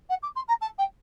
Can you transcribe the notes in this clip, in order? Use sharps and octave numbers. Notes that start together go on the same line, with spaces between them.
F#5
D6
C6
A#5
A5
G5